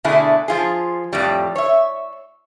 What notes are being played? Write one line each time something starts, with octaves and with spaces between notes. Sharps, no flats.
B2 D3 A3 E4 G#4
F3 F4 G#4
F2 A2 G3
C#5 E5